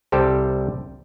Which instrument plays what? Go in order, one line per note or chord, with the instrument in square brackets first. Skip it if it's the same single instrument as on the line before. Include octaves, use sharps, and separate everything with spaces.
[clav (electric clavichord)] C2 G3 G4 A4 C5